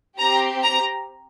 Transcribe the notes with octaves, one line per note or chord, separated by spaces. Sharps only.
C4 G4 A#5
A#5